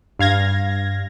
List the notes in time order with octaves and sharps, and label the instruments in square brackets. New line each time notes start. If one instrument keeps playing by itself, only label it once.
[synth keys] G2 F5 G#6 A#6